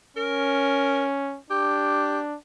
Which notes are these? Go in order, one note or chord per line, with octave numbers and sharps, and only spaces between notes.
C#4 A#4
D4 G4